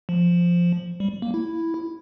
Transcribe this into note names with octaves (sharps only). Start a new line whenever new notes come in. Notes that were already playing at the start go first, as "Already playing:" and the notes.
F3
G3
A#3
E4